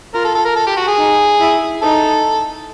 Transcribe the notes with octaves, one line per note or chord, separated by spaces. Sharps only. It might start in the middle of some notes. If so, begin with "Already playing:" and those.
F4 A#4
A4
A4
A#4
A4
G4
F#4
G#4
D#4
E4
D#4 A4